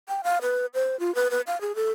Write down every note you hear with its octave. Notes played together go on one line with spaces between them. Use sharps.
G5
F5
B4
C5
F4
B4
B4
F5
G#4
A4